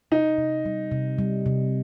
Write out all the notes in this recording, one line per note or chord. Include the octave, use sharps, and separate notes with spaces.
C3 D#4
C3
G3
C3
G3
C3